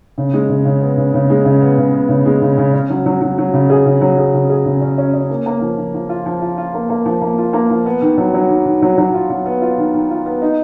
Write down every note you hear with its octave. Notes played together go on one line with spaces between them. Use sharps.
C#3
G#3
C#3
C#3
B3
C#3
C#3
G#3
C#3
B3
C#3
B3
C#3
G#3
C#3
C#3
C#4
F#3
F#3
F#3
F#3
C#3
G#4
C#3
F#3
G#4
C#3
G#4
C#3
C#4
C#4
C#4
A#3
A#3
F3
F3
F3
F4
F3
F4
F4
A#3
A#3
F3
A#3
F4
A#3
F3
B3
D#3
F#3
F#3
D#3
D#3
F#3
F#3
F4
F#3
B3
F4
D#3
D#3
F4
B3
D#4